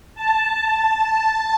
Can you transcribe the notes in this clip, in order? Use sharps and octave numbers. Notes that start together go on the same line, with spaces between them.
A5